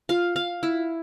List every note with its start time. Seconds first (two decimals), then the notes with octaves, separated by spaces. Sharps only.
0.09 F4 F5
0.36 F5
0.63 E4